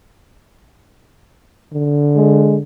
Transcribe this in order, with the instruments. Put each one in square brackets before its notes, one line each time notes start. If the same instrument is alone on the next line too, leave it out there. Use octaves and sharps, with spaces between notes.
[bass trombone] D3
[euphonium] G#3